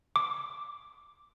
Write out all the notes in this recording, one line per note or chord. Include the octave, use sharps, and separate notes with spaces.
D6